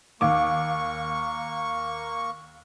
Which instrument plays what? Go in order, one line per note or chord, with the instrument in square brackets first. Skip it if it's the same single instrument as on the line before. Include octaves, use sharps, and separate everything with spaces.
[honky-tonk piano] D#2 D6 [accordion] A#3 C#6